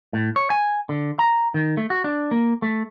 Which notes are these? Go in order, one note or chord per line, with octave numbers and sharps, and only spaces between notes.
A2
C#5
G#5
D3
A#5
D#3
A3
F#4
D4
A#3
A3